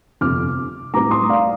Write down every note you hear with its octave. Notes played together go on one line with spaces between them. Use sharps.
G1 F2 C3 D6 F6
A2 G3 C4 D#4 A#5 D6
C6 D#6
D5 F5